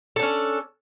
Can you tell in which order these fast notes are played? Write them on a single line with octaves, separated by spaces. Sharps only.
A4 D4 C#4